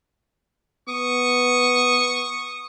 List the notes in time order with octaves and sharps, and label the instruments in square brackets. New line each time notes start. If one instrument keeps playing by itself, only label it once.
[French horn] B3 [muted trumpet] C#6 [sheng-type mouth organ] D#6